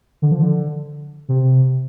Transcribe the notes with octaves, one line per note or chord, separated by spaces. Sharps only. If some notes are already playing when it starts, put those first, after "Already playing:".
D3
F3
D3
C3